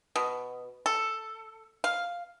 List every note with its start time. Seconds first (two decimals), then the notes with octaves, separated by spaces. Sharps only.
0.16 B2
0.86 A4
1.84 F5